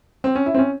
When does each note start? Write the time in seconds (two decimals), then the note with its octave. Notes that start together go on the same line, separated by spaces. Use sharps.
0.24 C4
0.35 C#4
0.46 E4
0.54 C4
0.58 C#4